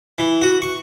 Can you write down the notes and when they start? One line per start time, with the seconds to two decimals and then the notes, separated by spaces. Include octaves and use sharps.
0.18 E3
0.42 F#4
0.62 C#6